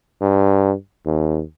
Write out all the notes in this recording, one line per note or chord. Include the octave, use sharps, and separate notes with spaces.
G2
D#2